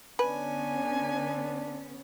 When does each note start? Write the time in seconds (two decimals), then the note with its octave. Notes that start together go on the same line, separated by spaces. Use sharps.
0.19 D3 B3 C#4 D4 B4 G#5